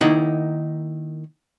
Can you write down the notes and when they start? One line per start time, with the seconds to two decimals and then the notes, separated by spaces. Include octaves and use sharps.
0.01 D#3 A#3 D#4 E4 F#5